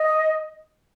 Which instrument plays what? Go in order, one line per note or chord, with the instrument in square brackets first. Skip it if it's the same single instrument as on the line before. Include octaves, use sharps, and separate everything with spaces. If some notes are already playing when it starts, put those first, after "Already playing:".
Already playing: [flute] D#5